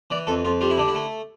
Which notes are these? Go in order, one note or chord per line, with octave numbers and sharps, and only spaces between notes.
E3 D5
F2 A4
F2 F4
G3 F4
E4
D3 D4
E4
A3